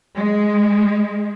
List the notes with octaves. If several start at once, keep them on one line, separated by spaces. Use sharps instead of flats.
G#3